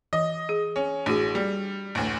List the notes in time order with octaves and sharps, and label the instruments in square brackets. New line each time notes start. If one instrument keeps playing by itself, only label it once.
[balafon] E3 [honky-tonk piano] D#5
[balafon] G#4
[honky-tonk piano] C#4 [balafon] C#5
[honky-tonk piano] A1 [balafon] D4 F#4 G#4
[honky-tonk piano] G3
A1 D2